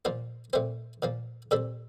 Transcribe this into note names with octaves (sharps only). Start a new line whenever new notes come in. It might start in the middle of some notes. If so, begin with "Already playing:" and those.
A#2 F3 A#3 C5
A#2 A3 C4 C5
A#2 F3 A#3
A#2 G3 C4 A4